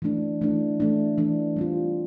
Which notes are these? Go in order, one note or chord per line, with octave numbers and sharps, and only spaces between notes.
E3 A3 D4
E3 A3 D4
E3 A3 D4
E3 A3 D4
G3 C4 F4